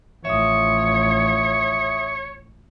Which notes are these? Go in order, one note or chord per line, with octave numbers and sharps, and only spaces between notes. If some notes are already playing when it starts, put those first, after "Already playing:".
A1 F3 C#5 E5 D#6